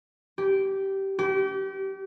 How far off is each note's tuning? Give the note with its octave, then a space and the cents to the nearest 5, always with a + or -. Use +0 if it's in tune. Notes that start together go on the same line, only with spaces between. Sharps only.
G4 -15
G4 -35